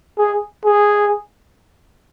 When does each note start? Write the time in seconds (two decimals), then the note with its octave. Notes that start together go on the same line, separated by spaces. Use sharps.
0.18 G#4
0.65 G#4